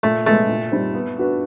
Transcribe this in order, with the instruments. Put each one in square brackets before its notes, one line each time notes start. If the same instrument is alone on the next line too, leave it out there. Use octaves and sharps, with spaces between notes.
[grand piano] A#2 [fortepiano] A3
[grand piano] F3 G#3 B3 [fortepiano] A3
[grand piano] A#2
G3 C4 D#4
B3
D4 F#4 B4